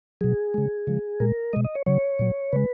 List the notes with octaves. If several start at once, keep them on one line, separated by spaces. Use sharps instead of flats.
B2 F#3 G#4
C#3 G#3
C#3 F3 G#3
A#2 G#3 A#4
B2 G#3 D#5
D#5
C#5
C#3 F#3 C#5
A#2 F#3
C#3 G#3 B4